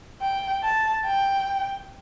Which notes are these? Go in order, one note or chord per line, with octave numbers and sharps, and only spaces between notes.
G5
A5
G5